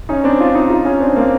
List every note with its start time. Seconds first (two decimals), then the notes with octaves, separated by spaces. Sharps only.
0.09 C#4 D#4
0.24 C4 D4
0.40 D#4 F4
0.55 D#4 F4
0.70 D#4 F4
0.85 C#4 D#4
1.00 C4 D4
1.16 A#3 C4